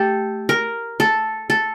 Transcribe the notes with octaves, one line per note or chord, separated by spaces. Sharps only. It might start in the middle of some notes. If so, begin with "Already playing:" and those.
Already playing: A3 G4 A4
A#4
A4
A4